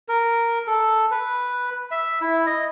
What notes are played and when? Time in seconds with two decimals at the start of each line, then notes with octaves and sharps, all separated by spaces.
0.09 A#4
0.67 A4
1.11 B4
1.91 E5
2.21 E4
2.46 D#5